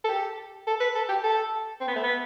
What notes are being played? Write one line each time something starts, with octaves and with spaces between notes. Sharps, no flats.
A4
G4
A4
B4
A4
G4
A4
C4
B3
A3
B3